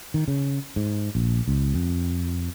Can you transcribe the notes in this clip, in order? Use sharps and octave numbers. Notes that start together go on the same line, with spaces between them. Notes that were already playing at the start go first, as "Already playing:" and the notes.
D#3
C#3
G#2
A#1
C#2
F2